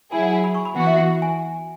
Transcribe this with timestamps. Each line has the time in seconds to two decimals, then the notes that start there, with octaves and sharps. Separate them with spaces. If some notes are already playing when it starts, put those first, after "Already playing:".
0.12 F#3 E4 G#4 G#5
0.23 F#5
0.33 G#5
0.44 B5
0.54 C#6
0.65 B5
0.75 E3 B3 F#4 F#5
0.86 E5
0.96 F#5
1.22 G#5